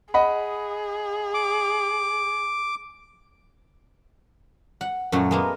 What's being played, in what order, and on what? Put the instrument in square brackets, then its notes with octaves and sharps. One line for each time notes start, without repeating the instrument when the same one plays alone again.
[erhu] G#4 [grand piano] D#5 F#5 B5
[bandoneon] D6
[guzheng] F#5
F#2 A#2 F#3 A3 F#4
G#3 A#3 B3